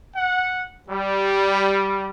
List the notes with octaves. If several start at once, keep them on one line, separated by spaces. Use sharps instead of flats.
F#5
G3